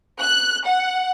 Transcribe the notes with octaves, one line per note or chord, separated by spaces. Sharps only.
F#6
F#5